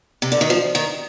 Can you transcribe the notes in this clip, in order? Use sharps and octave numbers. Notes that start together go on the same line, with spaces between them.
C3
D3
D#3
F3
D#3